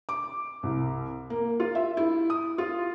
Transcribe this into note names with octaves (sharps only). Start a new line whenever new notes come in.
D6
C2
A#3
F4
E5
E4
D#6
F4